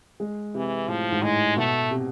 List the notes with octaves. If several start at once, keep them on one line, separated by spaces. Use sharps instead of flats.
G#3
C3 E3
A2 F3
G#2
A2 G#3
B2 A3
C3